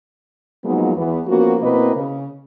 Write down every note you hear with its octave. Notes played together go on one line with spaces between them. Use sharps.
F3 F#3 G#3 A#3 B3 D#4
E2 B3
F3 A#3 B3 C#4 F#4
B2 A#3 C4 E4 B4 D#5
C#3